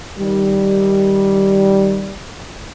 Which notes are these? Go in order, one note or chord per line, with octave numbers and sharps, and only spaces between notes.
D#3 G3